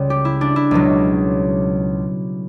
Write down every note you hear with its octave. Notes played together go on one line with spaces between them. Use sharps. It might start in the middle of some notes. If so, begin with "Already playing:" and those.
Already playing: C#2 C#3 G3
G4
E4
D4
E4
C#2 B2 F#3